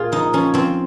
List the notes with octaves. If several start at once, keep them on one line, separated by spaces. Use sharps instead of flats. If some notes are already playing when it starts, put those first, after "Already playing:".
Already playing: A#2 F4 G#4
F3 D#4
F3 C#4
F3 C4